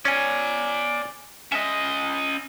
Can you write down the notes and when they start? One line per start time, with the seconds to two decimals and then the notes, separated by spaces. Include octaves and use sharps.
0.05 C#4 D5 G#5
1.52 C#4 D#5 E5